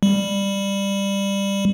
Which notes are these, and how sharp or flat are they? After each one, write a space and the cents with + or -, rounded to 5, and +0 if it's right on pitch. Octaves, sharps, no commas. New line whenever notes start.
G3 +15